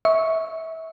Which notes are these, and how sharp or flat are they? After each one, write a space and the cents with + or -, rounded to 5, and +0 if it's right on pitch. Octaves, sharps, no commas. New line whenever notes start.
E5 -30 C#6 +0